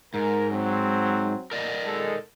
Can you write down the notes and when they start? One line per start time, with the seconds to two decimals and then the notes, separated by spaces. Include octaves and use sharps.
0.14 G#2 A#4
0.51 F#3 C4
1.51 A#4 D5 D#5
1.86 G#3 A4